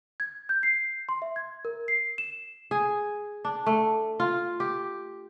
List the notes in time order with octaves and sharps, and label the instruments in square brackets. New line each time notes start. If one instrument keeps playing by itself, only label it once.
[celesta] G#6
G6
C7
C6
E5
G#6
A#4
C7
E7
[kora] G#4
D4
A3
F4
G4